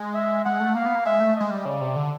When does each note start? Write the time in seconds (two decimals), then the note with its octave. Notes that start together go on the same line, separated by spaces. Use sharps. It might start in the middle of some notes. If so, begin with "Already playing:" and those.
Already playing: G#3
0.15 E5
0.45 G#3 F#5
0.60 A3
0.75 A#3 F5
0.86 B3
0.95 A#3
1.05 G#3 E5
1.20 A3
1.36 G#3 D#5
1.51 G3
1.65 C#3 D5
1.81 C3
1.96 D3